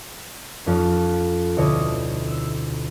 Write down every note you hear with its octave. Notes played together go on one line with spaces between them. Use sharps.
F2 C#4
D2 B2 E4 C#5 D#5
E6